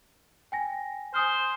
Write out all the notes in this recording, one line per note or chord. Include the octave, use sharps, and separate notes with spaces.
G5 G#5 A#6
C5 G#5 D#6 F6